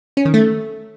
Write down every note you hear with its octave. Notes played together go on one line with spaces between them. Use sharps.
C#4
D#3
A3